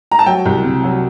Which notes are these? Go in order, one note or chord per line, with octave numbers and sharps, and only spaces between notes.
A#5
A5
F#3 G5
C2
C3
F#3